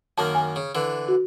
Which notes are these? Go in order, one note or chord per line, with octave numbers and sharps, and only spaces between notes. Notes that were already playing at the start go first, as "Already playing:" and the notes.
F#2 D#3 A#3 A5
G#5
C#3
D3 E3
F#4